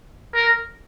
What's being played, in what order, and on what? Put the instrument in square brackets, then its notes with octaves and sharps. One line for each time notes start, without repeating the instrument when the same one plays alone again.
[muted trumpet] A#4